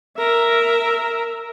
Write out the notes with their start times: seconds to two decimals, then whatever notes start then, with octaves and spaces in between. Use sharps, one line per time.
0.18 A#4 E5